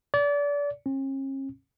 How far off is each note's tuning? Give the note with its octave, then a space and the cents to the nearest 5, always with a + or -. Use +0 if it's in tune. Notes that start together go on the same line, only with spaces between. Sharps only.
D5 -30
C#4 -45